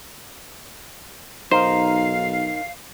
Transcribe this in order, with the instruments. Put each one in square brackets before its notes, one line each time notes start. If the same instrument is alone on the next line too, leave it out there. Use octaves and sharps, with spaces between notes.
[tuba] B1 [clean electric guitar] D#4 A#4 [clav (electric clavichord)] C5 [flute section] F5